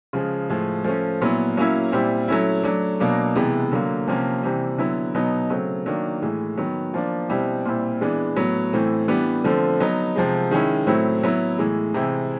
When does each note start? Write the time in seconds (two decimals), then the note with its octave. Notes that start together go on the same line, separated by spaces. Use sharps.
0.13 C#3 F3 G#3
0.50 A2 F3 G#3
0.84 F3 A3 C#4
1.21 A#2 F#3 B3 E4
1.57 F#3 A#3 C#4 E4
1.92 A#2 G3 C4 E4
2.28 F#3 A3 C#4 E4
2.64 F#3 A3 D4
3.00 B2 F#3 A#3 D4
3.35 C3 E3 G#3 B3
3.72 D3 F#3 A#3
4.08 C3 F3 A#3 C#4
4.43 C3 E3 G3 C4
4.78 D3 F#3 B3 E4
5.14 B2 F#3 B3 D#4
5.50 C#3 F#3 A3 C4
5.86 D#3 F#3 A#3 D4
6.22 A2 E3 G#3
6.57 D#3 F#3 B3
6.94 F3 A#3 D4
7.29 B2 G3 C4 E4
7.65 A#2 G3 C4 E4
8.01 E3 G#3 B3 D4
8.36 A2 F#3 B3
8.73 A2 E3 A3 C4
9.08 E3 G3 B3 D4
9.44 D3 F3 A3 C4
9.80 F#3 B3 D#4
10.16 C3 F3 G#3
10.51 D#3 G#3 C#4 E4
10.87 A2 F#3 A3 C4 E4
11.23 F#3 B3 E4
11.58 A2 E3 G#3
11.94 C3 E3 G#3 C4 E4